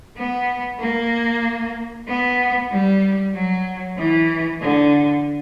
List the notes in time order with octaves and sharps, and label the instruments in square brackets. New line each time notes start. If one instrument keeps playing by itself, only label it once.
[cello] B3
A#3
B3
G3
F#3
E3
D3